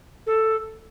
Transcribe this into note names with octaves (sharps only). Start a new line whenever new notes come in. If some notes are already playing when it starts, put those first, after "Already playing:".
A4